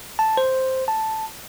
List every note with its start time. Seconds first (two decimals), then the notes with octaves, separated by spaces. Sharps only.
0.19 A5
0.37 C5
0.88 A5